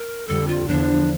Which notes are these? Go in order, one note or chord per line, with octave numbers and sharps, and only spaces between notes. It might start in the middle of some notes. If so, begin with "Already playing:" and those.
Already playing: A#4
F2 D3 G3 A4
F4
E2 D3 F3 D4